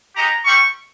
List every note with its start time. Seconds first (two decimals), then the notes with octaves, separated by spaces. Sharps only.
0.16 G#3 D#4 G4 A#5
0.45 G3 C4 G4 C#6